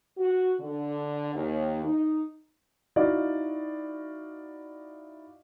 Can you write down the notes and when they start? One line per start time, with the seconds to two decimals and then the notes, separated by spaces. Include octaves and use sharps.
0.18 F#4
0.60 D3
1.34 D#2
1.85 D#4
2.96 D#4 E4 F#4 D5 D#5 F5